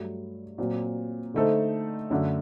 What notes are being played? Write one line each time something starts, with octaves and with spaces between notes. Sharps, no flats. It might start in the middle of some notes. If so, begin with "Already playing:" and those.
Already playing: G2 F#3 A3
A#2 F#3 C4
D3 A3 D#4 A4 C5
F#2 D3 A3 D4